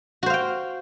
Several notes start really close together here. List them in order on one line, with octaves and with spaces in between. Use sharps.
F#4 C5 F5 G5